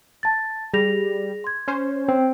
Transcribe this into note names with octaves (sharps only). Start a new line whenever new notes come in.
A5 A6
G3 G#4 A#6 F7
C6 G#6
C#4 C5
C4